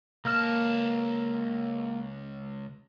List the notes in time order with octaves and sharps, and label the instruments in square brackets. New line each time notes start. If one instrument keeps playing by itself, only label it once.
[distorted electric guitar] C#2 A5 [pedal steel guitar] A#3 F6